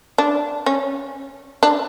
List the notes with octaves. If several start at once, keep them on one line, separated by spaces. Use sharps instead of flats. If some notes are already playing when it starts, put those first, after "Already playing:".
D4
C#4
D4